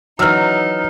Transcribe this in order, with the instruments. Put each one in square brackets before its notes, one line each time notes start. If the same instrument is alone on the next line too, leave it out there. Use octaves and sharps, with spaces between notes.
[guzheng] E3 F#3 [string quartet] D#4 [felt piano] E6 F6